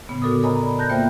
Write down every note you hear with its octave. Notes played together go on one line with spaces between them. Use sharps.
A2 C#3 B3
D3 F#4 A4 A#4 D6 D#6
A#4 C#5 D#5 G#5 A#5 B5
D5 B5
A5 F#6 G6 A#6
A#3 B3 F4 C5 E5 G5